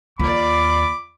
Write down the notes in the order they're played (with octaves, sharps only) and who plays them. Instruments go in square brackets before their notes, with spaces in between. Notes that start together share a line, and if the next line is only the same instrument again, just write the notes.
[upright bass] D#2 [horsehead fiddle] F4 D5 [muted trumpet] B5 [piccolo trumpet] D6